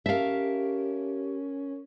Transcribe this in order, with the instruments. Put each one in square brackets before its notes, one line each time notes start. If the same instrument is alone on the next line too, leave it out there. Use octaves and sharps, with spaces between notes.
[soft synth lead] C#4 [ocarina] G4 [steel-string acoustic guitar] A#4 A5 [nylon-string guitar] E5 F5